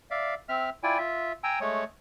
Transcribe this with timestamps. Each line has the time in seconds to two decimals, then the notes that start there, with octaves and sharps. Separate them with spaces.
0.11 D5 E5 F5
0.49 C4 E5 F6
0.83 E4 F4 D5 G5 G#5
0.98 F4 E5
1.44 G5 G#5 A#5 E6
1.61 G#3 A3 C#5